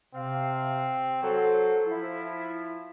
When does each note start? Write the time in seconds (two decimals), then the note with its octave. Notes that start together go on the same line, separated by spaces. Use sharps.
0.14 C3 C4 F5
1.23 F#3 A4 C5
1.86 F3 E4